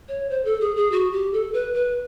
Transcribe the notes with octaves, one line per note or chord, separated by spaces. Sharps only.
C#5
C5
A4
G#4
G#4
F#4
G4
A4
B4
B4